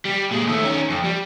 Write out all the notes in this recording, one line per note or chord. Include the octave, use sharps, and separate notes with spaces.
G3
A#2 G#3
D#2 A3
D#3 C#4
F2
G3